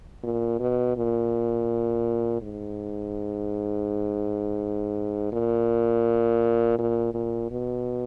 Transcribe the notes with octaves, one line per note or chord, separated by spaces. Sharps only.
A#2
B2
A#2
G#2
A#2
A#2
A#2
B2